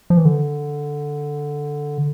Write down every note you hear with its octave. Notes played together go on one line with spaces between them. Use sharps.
F3
E3
D3